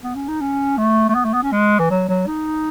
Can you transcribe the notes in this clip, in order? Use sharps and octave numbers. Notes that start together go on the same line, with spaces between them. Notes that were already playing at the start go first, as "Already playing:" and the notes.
B3
C#4
D#4
C#4
A3
A3
B3
A3
B3
C#4
G#3
E3
F#3
F#3
D#4